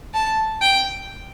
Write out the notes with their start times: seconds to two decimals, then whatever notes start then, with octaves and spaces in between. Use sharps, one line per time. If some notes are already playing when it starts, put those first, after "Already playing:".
0.14 A5
0.61 G5